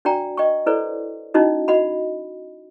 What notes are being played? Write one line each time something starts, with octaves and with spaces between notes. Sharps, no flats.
D4 F#4 D5 G5 A#5
D#5 G5 C#6
E4 A4 B4 C5 D5
C#4 D#4 E4 F#4 D#5
F#4 D#5 F#5 B5